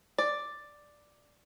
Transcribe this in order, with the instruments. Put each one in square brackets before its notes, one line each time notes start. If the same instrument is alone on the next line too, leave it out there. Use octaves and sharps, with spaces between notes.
[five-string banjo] D5